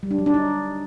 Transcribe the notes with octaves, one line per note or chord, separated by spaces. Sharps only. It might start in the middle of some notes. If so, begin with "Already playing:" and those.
G3
D4
F#3
D4
D#4